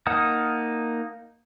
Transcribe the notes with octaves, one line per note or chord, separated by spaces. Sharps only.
A#3 D#4 F#5 A5 D#6